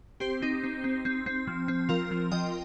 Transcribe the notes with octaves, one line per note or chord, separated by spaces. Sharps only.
C4 G4 C5
C4 D#4
C4
C4
C4
C4
F3
C4
F3 F4 A#4
F3
F3 D#5 G5